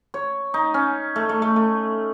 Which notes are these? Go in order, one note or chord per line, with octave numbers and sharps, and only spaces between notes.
C#5
D#4
C#4
A3
A3
A3
A3